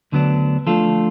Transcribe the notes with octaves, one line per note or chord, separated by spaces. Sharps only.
D2 D3 F#3 B3 D4
F3 A3 D4 F4 A4